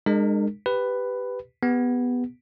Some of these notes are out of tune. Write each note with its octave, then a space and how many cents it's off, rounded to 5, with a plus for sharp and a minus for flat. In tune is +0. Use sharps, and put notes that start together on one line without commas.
G#3 -15 D4 +45 A#4 -25
G4 +0 B4 +10
B3 +0 G4 +35